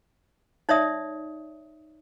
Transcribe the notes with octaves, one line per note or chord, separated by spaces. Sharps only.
D#4 C#5 D5 E5 D#6